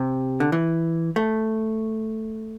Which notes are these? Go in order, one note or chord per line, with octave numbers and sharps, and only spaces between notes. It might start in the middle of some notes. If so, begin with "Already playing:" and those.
Already playing: C3
D3
E3
A3